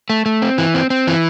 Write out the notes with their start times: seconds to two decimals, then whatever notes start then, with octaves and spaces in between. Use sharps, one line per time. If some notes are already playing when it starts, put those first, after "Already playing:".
0.10 A3
0.26 A3
0.42 C4
0.58 E3
0.74 C4
0.90 C4
1.07 E3